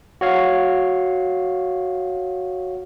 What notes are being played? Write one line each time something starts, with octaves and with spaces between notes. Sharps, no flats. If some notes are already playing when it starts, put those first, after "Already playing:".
F#4 C#5 F5